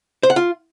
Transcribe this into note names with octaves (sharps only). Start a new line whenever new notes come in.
C5
F#5
F4